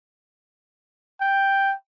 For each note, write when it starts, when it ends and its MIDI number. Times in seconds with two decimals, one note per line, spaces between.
1.21 1.74 79